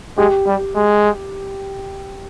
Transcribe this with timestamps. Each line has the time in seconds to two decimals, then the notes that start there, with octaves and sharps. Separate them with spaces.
0.18 G#3 G4
0.46 G3
0.75 G#3